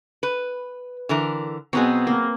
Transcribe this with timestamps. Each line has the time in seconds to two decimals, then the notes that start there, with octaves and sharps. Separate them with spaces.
0.23 B4
1.09 D3 E3 A#4
1.73 B2 F#3 B3 C4 G#4
2.07 A#3